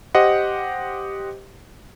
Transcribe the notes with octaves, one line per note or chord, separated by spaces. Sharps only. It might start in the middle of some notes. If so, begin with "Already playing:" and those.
G4 C5 D#5 F#5